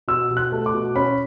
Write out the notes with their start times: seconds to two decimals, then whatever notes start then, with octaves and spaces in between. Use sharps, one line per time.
0.08 B2 E6
0.31 B2
0.37 F#6
0.52 A3
0.66 D6
0.74 B2
0.96 C#4 B5